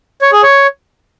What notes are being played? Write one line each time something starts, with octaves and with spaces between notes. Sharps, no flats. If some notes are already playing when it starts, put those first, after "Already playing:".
C#5
G#4
C#5